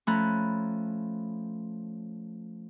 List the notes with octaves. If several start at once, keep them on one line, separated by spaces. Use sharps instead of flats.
F3 A3 C#4 A#5 B5 F#6